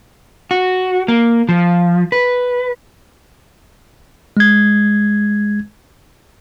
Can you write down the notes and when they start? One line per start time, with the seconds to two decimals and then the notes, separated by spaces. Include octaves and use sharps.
0.51 F#4
1.08 A#3
1.49 F3
2.12 B4
4.37 G#3 G#6